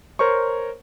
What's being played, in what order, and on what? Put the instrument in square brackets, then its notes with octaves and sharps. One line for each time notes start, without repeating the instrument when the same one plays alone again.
[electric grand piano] A#4 C5 C#5 C#6